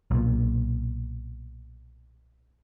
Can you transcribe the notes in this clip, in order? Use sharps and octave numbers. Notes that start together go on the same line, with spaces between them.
B1 A#2